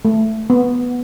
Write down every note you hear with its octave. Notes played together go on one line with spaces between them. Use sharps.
A3
B3